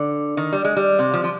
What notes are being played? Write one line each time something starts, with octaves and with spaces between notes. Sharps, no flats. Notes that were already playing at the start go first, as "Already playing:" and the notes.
Already playing: D3
D#3
G3
G#3
G3
C3
F3
F3